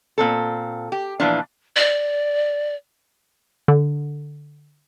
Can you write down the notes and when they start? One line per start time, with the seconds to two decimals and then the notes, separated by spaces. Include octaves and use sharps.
0.18 A#2 C4 A4
0.92 G4
1.20 A#2 E3 F3 D4
1.76 D5
3.68 D3